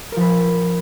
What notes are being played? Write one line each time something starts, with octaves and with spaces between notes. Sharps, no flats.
F3 A#4 B4